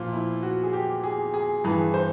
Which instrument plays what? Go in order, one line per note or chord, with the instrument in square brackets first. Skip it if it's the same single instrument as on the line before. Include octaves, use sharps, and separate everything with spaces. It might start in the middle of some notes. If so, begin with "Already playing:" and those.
Already playing: [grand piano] A#2 F3 F4
E4
F#4
G#4
G4
G#4
G#4
G2 E3 G#4
C5